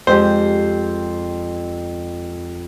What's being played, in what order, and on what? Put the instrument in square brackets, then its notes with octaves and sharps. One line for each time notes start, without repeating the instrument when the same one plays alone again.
[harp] F2 G#3 G4 [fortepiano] C5